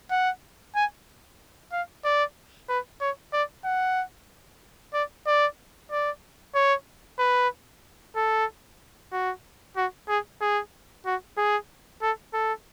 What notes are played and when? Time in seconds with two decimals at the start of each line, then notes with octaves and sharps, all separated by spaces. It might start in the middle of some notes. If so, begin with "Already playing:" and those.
0.11 F#5
0.76 G#5
1.72 F5
2.05 D5
2.69 B4
3.01 C#5
3.33 D5
3.65 F#5
4.93 D5
5.27 D5
5.91 D5
6.55 C#5
7.19 B4
8.16 A4
9.13 F#4
9.77 F#4
10.09 G#4
10.41 G#4
11.06 F#4
11.38 G#4
12.02 A4
12.34 A4